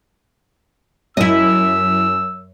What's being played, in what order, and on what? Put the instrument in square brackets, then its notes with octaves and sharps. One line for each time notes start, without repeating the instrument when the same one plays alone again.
[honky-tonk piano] F#2 [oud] E4 D#5 [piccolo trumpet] E6